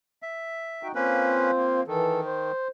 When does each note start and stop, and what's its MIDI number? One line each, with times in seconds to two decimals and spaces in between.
0.22 0.88 76
0.83 0.92 63
0.83 0.92 66
0.83 0.92 79
0.95 1.51 58
0.95 1.81 60
0.95 1.51 61
0.95 1.81 65
0.95 1.51 71
0.95 1.81 72
1.57 1.83 58
1.88 2.52 51
1.88 2.20 52
1.88 2.20 69
2.25 2.68 72